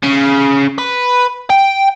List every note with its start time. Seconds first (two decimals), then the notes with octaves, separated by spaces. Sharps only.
0.04 C#3
0.79 B4
1.50 G5